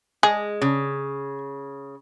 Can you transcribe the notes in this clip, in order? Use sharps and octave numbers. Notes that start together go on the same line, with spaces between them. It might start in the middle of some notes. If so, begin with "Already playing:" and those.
G#3 G#4
C#3